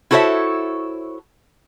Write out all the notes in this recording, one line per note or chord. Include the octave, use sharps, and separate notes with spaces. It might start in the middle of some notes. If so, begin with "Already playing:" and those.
E4 F#4 A4 C5 C#5 E5